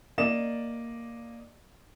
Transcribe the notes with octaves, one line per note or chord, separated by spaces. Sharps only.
A#3 D5 D#5 E7